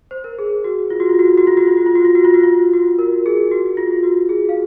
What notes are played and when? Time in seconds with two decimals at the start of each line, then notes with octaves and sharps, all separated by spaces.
0.11 C5
0.24 A#4
0.39 G#4
0.64 F#4
0.90 F4
1.00 F#4
1.09 F4
1.19 F#4
1.28 F4
1.38 F#4
1.47 F4
1.57 F#4
1.67 F4
1.77 F#4
1.86 F4
1.95 F#4
2.05 F4
2.15 F#4
2.24 F4
2.34 F#4
2.43 F4
2.73 F#4
2.99 A#4
3.26 G#4
3.51 F#4
3.77 F4
4.03 F#4
4.29 G#4
4.49 F5